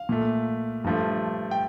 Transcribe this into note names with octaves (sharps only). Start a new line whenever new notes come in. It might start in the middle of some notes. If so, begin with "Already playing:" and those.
Already playing: F5
A#2 A3
G2 F3 A3
G5